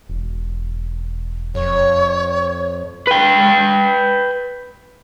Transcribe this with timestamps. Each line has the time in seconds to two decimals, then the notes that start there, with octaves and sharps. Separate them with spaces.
0.09 E1
1.55 F2 C#5
3.07 B4 G5